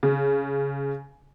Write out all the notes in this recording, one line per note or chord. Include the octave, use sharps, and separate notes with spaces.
C#3